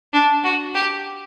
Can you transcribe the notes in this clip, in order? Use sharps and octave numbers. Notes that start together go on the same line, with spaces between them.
D4
F#4
G4